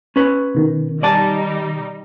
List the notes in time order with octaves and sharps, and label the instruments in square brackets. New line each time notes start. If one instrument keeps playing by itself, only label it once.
[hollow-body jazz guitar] C#4 B4
[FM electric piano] B2 D#3
[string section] G3 D#4 [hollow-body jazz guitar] D5 G#5 A5